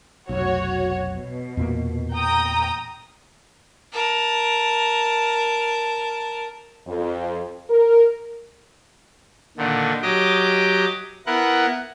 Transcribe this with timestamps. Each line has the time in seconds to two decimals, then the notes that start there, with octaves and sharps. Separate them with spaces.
0.29 F1 B1 F#4 C#5
1.12 B2
1.57 E2 A#2 A#3
2.14 G5 A#5 D#6
3.93 A#4 A5
6.85 F2
7.69 A#4
9.57 A#2 D3 D#3
10.03 F#3 G4 D#5 D6
11.26 B3 E4 A#4 F#5